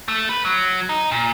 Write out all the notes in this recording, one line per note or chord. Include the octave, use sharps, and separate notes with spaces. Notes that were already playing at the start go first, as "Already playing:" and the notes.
A3
B4
F#3
D#4
A#2